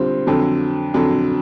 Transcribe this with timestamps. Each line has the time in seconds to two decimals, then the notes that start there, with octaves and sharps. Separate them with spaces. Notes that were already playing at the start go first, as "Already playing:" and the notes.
Already playing: D3 G3 C4 F4
0.27 F2 D3 F#3
0.94 F2 D3 F#3